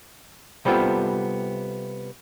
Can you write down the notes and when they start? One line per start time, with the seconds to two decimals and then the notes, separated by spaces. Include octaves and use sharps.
0.65 C3 G3 B3 C4 F4 A4